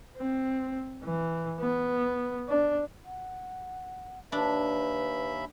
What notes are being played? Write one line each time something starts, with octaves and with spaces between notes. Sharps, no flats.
C4
E3
B3
D4
F#5
D#2 D4 B4 E5 B5